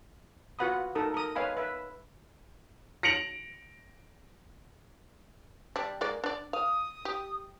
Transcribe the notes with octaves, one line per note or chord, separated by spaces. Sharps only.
F4 F#4 B4 F#5 B5 D#6
D#4 A4 A#4 A5 D#6
A#4 D#6
B4 C#5 D#5 F5 G#5 B5
B4 E5
A#6 C#7 D7 F7 F#7
G3 D4
G#3 A#3 D5
D4 D5
F5 D#6
G4